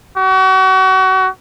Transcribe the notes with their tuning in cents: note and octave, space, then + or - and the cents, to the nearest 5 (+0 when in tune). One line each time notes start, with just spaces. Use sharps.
F#4 +35